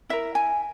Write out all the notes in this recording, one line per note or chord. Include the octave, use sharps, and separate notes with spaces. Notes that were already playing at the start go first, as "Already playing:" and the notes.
E4 A#4 E5
G#5